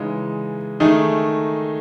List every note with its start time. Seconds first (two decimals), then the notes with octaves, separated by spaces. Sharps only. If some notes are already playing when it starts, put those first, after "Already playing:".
Already playing: C#3 E3 G#3 D#4
0.80 D#3 A3 D#4 G#4